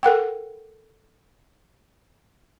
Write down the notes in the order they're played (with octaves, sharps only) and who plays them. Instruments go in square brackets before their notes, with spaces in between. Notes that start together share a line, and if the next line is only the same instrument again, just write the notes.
[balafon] A4 A#4 F#5 G5